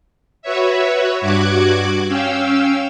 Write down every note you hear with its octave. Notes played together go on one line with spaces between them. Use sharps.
F#4 B4 C#5 E5
G2 F#4 D6 F#6 G#6
C#4 F5 G5 E6